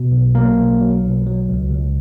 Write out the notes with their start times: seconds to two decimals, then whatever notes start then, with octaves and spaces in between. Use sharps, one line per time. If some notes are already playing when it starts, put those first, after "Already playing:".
Already playing: B2
0.11 B1
0.35 F#3 A#3 A#4
0.57 B1
0.81 F#3
1.04 B1
1.26 F#3
1.49 C#2
1.71 C#2